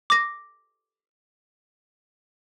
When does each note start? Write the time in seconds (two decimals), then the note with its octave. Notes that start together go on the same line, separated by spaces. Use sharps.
0.10 D6 A#6